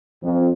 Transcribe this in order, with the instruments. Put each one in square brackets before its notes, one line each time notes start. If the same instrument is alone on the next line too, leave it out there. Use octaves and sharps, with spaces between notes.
[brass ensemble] F2